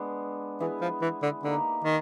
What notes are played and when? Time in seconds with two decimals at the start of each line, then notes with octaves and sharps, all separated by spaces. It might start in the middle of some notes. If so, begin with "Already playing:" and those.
Already playing: G#3 B3 D4
0.60 E3 B3 E4 G#4
0.81 F3
1.02 E3
1.22 D3
1.43 D3 A#3 D#4 G4
1.84 D#3